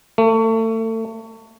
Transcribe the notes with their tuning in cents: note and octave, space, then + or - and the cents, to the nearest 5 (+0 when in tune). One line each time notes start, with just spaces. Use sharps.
A3 +30